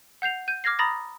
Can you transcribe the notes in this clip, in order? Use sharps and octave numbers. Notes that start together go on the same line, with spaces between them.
F#5 G6 C7 F7
G6 D#7
D6 F6 G#6 A#6 C7
A#5 B5 D#6 A6 A#6